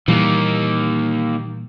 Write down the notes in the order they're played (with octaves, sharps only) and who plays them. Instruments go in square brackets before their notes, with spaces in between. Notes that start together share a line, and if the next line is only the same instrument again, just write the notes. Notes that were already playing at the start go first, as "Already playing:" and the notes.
[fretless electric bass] A#2 E3 G3 [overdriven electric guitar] D#3 A#3